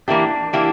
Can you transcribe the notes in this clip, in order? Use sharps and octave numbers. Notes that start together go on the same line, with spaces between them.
E3 A#3 D4 E4 G4
E3 A#3 E4 G4